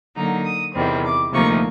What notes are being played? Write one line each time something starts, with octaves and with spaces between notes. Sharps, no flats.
D3 F#3 A#3 D#4 A#5
D#6
E2 C3 D#3 G3 C4
D6
D2 C3 F3 A#3 D#4 C#6